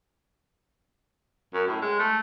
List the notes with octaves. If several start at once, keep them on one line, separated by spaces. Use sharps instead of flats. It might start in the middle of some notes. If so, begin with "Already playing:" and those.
F#2
A2
G#3
A3